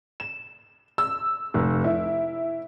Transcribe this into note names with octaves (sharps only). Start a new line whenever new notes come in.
E7
E6
F1
E4